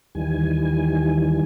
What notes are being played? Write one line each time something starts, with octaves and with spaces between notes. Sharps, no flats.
D#2 D#3 E3 G3 G#5